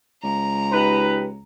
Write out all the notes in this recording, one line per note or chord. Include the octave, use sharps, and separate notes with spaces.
C#2 A#5
D#4 G4 B4